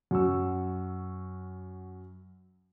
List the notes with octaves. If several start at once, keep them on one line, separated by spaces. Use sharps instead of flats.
F#2 F#4 C#6 E6